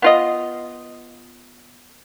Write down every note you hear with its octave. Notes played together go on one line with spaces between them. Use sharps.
B3 F4 D#5